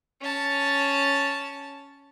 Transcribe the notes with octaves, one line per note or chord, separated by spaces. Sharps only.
C#4 A5